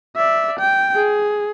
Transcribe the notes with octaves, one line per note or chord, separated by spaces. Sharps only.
D5 E5
G5
G#4